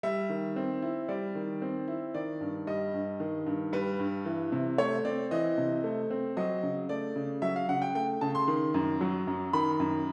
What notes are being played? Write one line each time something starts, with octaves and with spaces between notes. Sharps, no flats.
G3 E5
D#3
C4
E4
G3 D5
D#3
C4
E4
D#3 D5
G2
G3 D#5
G2
D#3
G2
G3 B4
G2
E3
C3
A3 C#5
C4 D5
E3 D#5
C3
A3
C4
F#3 D#5
C#3
A3 D5
C#3
F#3 E5
F5
C#3 F#5
G5
A3 G5
C#3 A5
C6
D#3
F#2
F#3
F#2
D#3 B5
F#2